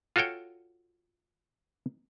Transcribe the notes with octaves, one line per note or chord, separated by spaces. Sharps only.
F4 F#4 A4 C#5 G5